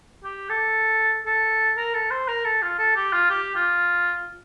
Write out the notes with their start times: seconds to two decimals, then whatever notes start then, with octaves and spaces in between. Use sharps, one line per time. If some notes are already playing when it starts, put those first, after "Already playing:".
0.24 G4
0.49 A4
1.26 A4
1.77 A#4
1.94 A4
2.11 C5
2.28 A#4
2.45 A4
2.62 F4
2.79 A4
2.96 G4
3.13 F4
3.30 G4
3.55 F4